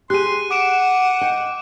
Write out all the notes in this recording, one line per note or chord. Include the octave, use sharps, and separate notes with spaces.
G4 G#4 C6 F#6 D#7
F#5 D6 D7 E7
D#5 G5